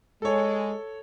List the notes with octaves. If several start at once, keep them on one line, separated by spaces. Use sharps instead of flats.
G#3 A4 C#5